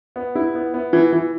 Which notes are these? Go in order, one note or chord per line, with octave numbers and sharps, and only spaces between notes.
B3
E4
B3
B3
E3
E3